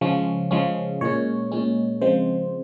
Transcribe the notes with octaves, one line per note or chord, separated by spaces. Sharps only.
C#3 F3 G#3 C#4
C#3 F3 G#3 C#4
A#2 G#3 C#4 C#5
A#2 G#3 C#4
C#3 F3 G#3 C4 C5